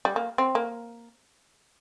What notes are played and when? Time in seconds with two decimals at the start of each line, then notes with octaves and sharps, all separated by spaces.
0.05 G3
0.16 A#3
0.38 C4
0.55 A#3